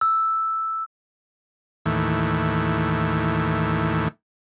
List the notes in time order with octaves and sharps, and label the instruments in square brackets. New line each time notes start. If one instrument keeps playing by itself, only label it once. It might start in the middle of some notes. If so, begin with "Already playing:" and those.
[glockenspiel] E6
[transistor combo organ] D#2 A2 E3